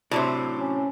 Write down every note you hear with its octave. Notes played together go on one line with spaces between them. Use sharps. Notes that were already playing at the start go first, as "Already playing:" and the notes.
A2 C3 F#3 D4 C5
C#4